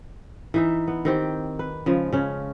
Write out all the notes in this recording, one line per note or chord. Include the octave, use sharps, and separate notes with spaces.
E3 D#4 E5
B3
D#3 C4 G4
B4
C#3 F3 G#3
C#3 C#4